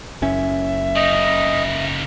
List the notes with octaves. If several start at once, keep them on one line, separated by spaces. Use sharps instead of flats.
F#1 F#2 C#4 E5
C#3 D#4 D#5